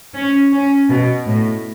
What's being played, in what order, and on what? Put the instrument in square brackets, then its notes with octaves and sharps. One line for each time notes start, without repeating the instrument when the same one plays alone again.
[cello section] C#4
C#4
B2
A2